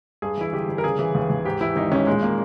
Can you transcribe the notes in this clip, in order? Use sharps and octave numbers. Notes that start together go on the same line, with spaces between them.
G2 G#4
E3 E4
G1 G4
G1
A#4
C#3 G#4
E3
D#2
D#2
G#2 G4
E3 E4
G#1 D#4
G#1 C#4
A#2 G#3
A#3